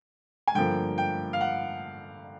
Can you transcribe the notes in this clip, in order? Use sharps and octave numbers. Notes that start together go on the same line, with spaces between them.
G#5
G2 D3 F3 A#3 G5
G5
F5
F#5